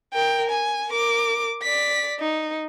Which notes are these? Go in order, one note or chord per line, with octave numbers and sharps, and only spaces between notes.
A#4 G5
G#5
A#4 D6
D5 B6
D#4